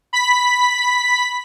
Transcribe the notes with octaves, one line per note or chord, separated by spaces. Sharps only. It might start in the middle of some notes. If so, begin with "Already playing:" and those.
B5 B6